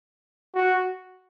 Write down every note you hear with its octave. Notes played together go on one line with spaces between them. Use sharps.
F#4